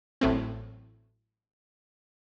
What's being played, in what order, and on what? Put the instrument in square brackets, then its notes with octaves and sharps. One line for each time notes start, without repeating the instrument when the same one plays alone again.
[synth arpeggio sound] A1 A2 F#3 A3 C4